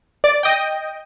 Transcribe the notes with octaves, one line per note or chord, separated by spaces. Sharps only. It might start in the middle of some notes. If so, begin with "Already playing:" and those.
D5
D#5 G5